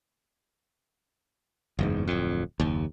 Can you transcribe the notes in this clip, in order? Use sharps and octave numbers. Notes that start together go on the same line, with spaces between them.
F#1 E2 G#2
D1 F2
F#1 D#2